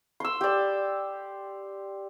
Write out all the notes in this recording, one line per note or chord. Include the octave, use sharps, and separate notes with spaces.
C6 E6
G4 D5